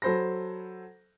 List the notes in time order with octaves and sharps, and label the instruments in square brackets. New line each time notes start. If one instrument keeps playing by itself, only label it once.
[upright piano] F#3 A4 C5 B5 A#6